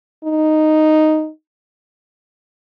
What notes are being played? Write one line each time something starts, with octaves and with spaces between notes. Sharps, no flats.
D#4